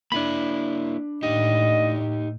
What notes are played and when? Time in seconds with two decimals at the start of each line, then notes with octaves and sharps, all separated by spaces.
0.12 A#3 D4 E4 B5
1.23 A2 D#4 G4 D#5